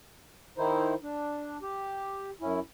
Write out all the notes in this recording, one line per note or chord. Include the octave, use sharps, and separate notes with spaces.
D#3 D#4 E4 C5
D4
G4
F#2 C#4 E4